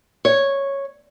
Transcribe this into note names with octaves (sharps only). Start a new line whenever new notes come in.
C#5